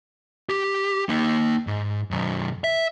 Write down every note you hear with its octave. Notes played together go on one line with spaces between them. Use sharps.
G4
A#3 D#4
G#2
B1 F#2
E5